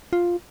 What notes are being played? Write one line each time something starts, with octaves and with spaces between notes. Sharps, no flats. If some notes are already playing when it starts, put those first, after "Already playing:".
F4